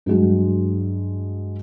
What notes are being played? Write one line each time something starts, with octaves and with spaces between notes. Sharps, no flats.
G2 F#3 G#3 F#4